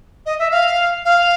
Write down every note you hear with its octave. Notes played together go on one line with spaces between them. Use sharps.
D#5
E5
F5
F5